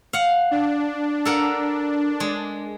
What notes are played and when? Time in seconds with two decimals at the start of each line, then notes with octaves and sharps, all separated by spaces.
0.13 F5 F#5
0.51 D4
1.25 A4 A#4 F#5
2.20 G#3